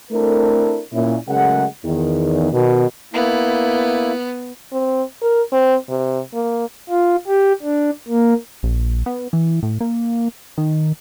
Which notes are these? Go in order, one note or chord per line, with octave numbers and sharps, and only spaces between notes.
A3 C4 D4 E4 A4 A#4
A#2 C#4 E4
C#3 F#3 G#3 A3 A#4 F#5
E2 D#3
B2 D#3
A#3 B3 E4
C4
A#4
C4
C3
A#3
F4
G4
D4
A#3
A#1
B3
E3
A2
A#3
D#3